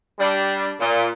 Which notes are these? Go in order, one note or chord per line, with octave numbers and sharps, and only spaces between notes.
G3 D4
A#2